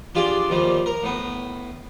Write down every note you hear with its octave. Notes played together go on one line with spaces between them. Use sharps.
D4 F4 G4 G#4 D5
D#2 A#2 F3 G3
A#4
A2 B3